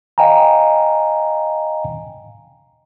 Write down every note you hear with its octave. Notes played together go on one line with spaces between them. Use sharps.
D#5 F5 G5 G#5 A#5